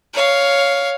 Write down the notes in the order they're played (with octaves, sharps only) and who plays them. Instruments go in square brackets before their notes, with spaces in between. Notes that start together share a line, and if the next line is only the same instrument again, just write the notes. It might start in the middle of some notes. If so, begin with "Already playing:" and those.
[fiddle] C#5 F5